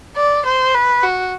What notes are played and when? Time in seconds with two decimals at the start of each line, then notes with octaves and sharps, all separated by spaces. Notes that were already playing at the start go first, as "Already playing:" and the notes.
0.16 D5
0.46 C5
0.74 B4
1.03 F#4